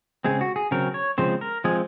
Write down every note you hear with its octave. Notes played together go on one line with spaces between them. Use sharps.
C#3 G#3 C4 G#4
F#4
G#4
C#3 F#3 C4 A#4
C#5
C#3 F3 G#3 C4 C5
A#4
F3 G#3 C4 G#4